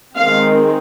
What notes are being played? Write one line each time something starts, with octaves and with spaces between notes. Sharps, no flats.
D#3 G#3 C4 F5